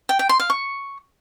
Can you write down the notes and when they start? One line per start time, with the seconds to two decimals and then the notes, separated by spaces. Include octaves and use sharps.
0.09 G5
0.19 G5
0.29 C6
0.40 F5
0.50 C#6